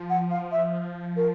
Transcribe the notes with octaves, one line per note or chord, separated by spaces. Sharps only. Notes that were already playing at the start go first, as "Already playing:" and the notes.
Already playing: F3
F#5
F5
E5
A#4